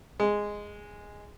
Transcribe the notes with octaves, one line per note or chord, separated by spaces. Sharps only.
G#3